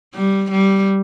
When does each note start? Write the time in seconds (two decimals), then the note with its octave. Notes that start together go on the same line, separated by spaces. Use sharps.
0.14 G3
0.51 G3